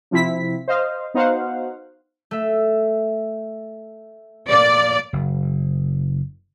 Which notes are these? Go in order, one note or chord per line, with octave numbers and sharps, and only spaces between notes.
C3 F3 C4 E4 B6
C5 D#5 F5
B3 D#4 F#4 C5 F5 F#5
A3 E5
A#2 A#3 D5
F#1